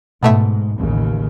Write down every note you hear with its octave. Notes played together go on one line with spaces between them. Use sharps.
G#2 B2 A3 E5
A1 D#2 C#3